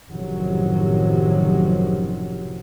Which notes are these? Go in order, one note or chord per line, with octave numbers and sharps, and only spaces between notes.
F#1 A2 C3 D#3 F3 F#3